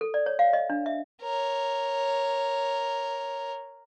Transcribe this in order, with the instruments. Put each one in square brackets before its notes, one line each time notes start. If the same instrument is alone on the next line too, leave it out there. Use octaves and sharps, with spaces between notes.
[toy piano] A4
D5
C#5
F5
D#5
D4
E5
[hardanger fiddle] A#4 C#5